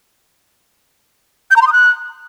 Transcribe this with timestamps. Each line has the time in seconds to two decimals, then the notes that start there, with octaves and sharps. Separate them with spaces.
1.51 G6
1.56 A#5
1.62 C6
1.67 D#6
1.73 F#6